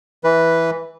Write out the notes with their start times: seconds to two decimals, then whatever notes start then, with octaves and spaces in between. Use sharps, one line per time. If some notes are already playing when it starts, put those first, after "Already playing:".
0.24 E3 B4